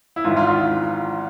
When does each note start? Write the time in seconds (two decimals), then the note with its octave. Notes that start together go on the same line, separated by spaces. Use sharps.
0.16 E4
0.25 G#1 G#2 E3 F4
0.37 F4
0.47 F4